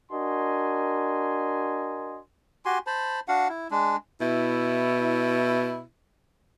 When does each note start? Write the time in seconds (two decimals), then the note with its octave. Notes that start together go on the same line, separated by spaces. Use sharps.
0.11 D4 F#4 A#4 D#5 G#5 C6
2.65 F#4 G4 G#5 C6
2.87 C5 A5 B5
3.28 D4 F#4 F5 F#5
3.49 E4
3.71 G#3 D4
4.21 B2 E4